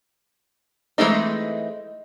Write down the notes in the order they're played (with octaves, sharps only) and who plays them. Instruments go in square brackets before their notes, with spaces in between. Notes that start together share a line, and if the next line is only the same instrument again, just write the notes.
[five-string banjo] E3 G#3 A3 C4 D#4